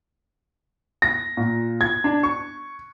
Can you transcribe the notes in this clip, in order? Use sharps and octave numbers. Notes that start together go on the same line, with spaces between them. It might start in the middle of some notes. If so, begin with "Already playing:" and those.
A#6
A#2
G#6
D4
C#6